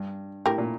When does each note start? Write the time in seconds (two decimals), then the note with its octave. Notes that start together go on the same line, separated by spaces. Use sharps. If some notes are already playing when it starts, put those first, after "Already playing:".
Already playing: G2
0.46 A2 G4 A#4
0.58 A#2